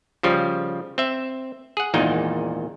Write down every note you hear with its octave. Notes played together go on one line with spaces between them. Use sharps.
C#3 F3 G3
C4 E5
G#4 F#5
G#1 E2 A#2 A#3 D#4